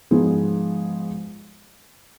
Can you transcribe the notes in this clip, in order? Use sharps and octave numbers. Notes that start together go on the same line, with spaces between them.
G#2 F3 B3 D#4 G#4